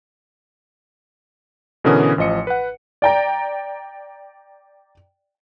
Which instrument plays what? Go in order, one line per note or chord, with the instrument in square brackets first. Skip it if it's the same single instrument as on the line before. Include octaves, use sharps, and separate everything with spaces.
[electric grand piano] B2 D3 E3 C#4 A#4 D#6
A1 F3 D#5 C#7
B4 F#5
[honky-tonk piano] D5 G5 A#5